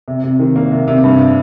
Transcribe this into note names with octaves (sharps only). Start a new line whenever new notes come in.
C3
C3
D#3
A#3
C3
C3
G2